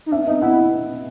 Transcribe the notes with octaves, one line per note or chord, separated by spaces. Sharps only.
D#4
D4 E5
D#4 D#5
E4 F#5